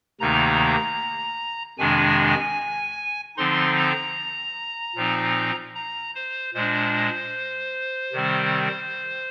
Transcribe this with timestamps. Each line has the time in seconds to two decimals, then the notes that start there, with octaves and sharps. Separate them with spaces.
0.20 D2 C3 D#3 A#3 D#4 A#5
1.78 F2 C3 D#3 G#3 D4 G#5
3.37 D3 F3 C4 D#4 C6
3.77 A#5
4.95 A#2 F3 C4 D#4
5.75 A#5
6.15 C5
6.54 A#2 G#3 D4 C5
8.13 C3 D#3 G3 C4